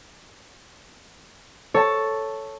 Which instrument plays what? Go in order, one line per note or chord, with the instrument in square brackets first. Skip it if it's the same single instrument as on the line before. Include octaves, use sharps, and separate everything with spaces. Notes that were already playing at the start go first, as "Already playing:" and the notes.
[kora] A4 [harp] C#5 A5